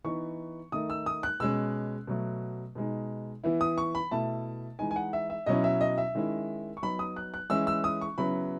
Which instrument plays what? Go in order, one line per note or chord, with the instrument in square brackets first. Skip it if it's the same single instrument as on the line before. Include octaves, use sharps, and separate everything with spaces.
[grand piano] E3 B3 D#4 C#6
D#3 A3 D#4 D#6
E6
D#6
F#6
B2 G#3 C#4 E6
B2 F#3 A3
B2 G#3 D#4
E3 B3 E4
D#6
C#6
B5
B2 A3 E4 A5
E3 G#3 D#4 G#5
G#5
F#5
E5
E5
B2 F#3 C#4 E4 D#5
E5
D#5
E5
D#3 G#3 C#4 E4
C#6
F#3 B3 D#4 B5
D#6
F#6
F#6
E3 G#3 C#4 E4 E6
E6
D#6
C#6
C#3 F#3 B3 E4 B5